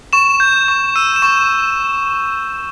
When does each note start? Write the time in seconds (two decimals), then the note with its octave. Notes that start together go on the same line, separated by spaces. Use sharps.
0.13 C#6 E7
0.40 G6
0.68 C#6
0.96 E6 D#7
1.16 E7
1.22 C#6